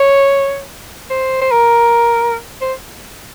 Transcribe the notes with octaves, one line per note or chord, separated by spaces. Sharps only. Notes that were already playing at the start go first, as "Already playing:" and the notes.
Already playing: C#5
C5
C5
A#4
C5